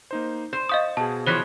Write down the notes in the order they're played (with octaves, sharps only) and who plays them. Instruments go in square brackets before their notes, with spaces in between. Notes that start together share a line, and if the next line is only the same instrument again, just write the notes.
[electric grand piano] A#3 D#4 C5
[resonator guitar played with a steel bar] C5 [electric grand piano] G6
[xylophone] D#5 F5 D#6 [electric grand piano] C#6 G6 A6
[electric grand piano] B2 G#4 [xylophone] A5
[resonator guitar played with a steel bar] E3 F3 C#5 [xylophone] C5 F#6 B6